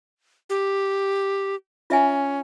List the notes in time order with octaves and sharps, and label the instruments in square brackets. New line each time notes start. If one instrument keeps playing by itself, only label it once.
[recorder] G4
[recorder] C#4 [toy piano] F4 E5 G#5